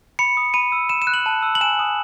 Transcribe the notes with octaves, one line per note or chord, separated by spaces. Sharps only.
B5 C#7
D#6
B5 D#7
E6
B5 E7
E7
F#6
F#7
A5
E6
F#7
G#5 E7
D#6